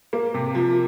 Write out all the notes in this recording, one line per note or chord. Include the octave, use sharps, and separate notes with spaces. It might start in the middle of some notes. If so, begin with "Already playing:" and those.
A#3
C3
F3